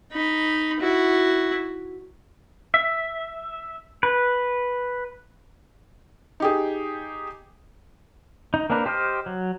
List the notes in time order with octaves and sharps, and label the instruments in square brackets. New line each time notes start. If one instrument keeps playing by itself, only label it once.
[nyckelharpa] D#4 B5
E4 F#4
[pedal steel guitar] E5
B4
[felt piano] D#4 G4 G#4
[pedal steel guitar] D#4
A#3 C4 D4 A#4 B4
G4 C5 D#5 G5 F6
F#3